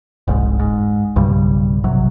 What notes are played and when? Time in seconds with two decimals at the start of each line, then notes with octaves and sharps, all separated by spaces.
0.28 F1 C2 G#2
0.59 G#2
1.16 B1 G2 C#3 G3
1.84 A#1 C3 F#3